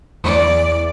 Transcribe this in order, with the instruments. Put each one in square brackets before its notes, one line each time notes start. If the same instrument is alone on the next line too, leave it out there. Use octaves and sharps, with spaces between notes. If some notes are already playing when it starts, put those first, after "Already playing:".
[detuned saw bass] E2 [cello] D5